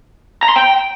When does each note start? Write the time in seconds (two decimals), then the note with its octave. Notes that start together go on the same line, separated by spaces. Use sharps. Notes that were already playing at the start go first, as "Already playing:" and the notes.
0.43 A#5
0.49 C6
0.56 G5